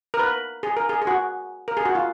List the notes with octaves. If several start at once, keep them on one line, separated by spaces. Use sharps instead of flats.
A#4
B4
G#4
A#4
G#4
G#4
F#4
A#4
G#4
F#4
F4